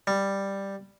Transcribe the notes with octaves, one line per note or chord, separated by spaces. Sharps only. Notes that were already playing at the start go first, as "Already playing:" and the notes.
G3